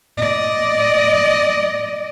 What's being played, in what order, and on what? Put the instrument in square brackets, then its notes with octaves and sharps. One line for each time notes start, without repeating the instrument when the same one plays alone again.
[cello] D5 D#5